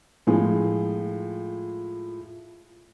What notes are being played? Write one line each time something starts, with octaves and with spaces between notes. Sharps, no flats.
A2 F3 G#3 F4 G#4